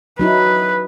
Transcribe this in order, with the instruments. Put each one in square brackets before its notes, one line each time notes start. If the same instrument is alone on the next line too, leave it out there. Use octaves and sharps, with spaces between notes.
[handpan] F#3 D#4 E4 [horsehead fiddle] B4